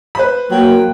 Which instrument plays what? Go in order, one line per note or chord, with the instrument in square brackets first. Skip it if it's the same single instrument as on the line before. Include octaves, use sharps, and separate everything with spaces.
[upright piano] B4 C5 B5
[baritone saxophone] F#3 [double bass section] A#3 [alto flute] G5